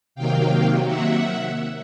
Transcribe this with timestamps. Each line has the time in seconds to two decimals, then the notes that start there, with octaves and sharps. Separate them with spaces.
0.15 C3 D#3 F#3 A#3 F5 G5
0.86 E5 F#5